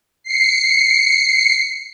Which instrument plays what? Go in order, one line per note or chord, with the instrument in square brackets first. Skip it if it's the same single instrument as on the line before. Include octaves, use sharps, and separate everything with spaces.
[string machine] C7 C#7